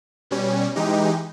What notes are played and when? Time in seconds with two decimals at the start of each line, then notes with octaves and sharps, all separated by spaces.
0.31 B2 G3 C#4
0.76 E3 G#3 D#4 G4